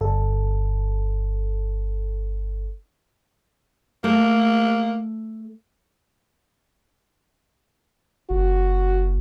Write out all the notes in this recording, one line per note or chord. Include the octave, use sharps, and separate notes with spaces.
G1 A4
A3 A#3
F#1 F#4